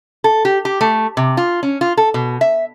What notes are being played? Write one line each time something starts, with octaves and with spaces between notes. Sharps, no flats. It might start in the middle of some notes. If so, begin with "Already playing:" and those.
A4
G4
G4
A3
C3
F4
C#4
F4
A4
B2
E5